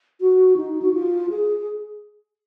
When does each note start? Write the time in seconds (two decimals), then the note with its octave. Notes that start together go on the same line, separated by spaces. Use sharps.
0.21 F#4
0.57 D#4
0.82 F#4
0.94 F4
1.30 G#4